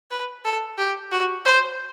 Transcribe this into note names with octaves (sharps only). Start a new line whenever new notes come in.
B4
A4
G4
F#4
C5